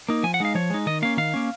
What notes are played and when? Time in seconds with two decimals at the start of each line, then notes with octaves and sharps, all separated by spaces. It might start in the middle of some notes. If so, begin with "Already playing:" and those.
0.09 A#3 D#4
0.23 F3 G#5
0.34 F#5
0.40 G#3 D#4 F5
0.55 F3 C#5
0.70 G#3 D#4
0.86 D#3 D#5
1.02 A#3 C#4 F5
1.17 D#3 F5
1.34 A#3 C#4